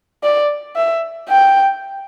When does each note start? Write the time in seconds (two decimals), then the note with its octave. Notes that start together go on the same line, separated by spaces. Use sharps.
0.23 D5
0.76 E5
1.29 G5